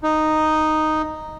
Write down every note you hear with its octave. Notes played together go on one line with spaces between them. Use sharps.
D#4